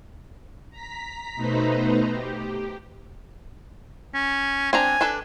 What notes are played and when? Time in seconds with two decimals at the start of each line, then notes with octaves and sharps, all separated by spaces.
0.70 A#5 B6
1.36 B2 A3 D#4 B4 C5 A#5
2.11 G4
4.14 C#4
4.73 C4 D4 G#5 A#5
5.01 D4 A4 B4